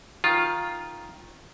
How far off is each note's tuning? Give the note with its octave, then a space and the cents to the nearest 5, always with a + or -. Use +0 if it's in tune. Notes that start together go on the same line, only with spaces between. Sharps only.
D#3 +5 F4 +0